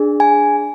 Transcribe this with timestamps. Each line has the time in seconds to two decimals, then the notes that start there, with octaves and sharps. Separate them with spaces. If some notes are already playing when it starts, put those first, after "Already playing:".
Already playing: D4 G#4
0.20 G#5